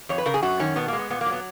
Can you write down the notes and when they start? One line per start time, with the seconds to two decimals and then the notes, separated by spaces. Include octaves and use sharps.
0.09 F2 C#5
0.18 B4
0.26 C#3 A#4
0.34 G#4
0.43 F#2 F#4
0.59 D#3 C#4
0.76 B2 B3
0.88 G#3 A#3
0.99 B3
1.10 A#2 B3
1.21 A#3
1.26 F#3
1.32 B3